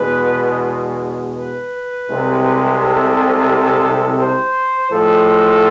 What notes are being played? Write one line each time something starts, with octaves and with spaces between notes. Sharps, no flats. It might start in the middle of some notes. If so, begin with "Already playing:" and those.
Already playing: E2 B2 G#3 B4
B4
C2 C3 G#3
A4
C5
A2 F3 G#3 A4